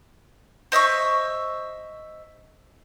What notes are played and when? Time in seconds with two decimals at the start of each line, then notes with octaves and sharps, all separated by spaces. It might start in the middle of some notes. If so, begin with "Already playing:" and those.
0.72 C5 D#5 E5 C#6